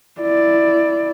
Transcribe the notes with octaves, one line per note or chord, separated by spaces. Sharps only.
E4 D5